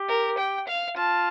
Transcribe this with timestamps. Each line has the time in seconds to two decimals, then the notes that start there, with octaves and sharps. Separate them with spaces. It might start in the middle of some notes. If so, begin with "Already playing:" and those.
Already playing: G4
0.08 A#4
0.38 G5
0.67 F5
0.97 F4 A5